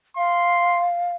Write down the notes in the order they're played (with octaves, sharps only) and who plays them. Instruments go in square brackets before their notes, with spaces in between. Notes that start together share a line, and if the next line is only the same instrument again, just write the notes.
[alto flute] F5 [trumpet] C6